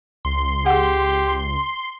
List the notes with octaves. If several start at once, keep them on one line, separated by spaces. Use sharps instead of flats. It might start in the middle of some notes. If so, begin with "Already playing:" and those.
C#2 C6
G4 G#4 F#5